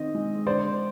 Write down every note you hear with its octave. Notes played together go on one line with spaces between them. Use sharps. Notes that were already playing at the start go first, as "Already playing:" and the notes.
Already playing: D#3 C4 D#5
G#3
D3 C5 D5